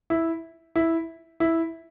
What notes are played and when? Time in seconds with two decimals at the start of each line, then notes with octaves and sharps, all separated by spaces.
0.10 E4
0.76 E4
1.40 E4